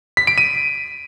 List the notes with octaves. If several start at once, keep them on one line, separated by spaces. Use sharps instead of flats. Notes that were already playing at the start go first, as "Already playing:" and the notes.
B6
D7
D#7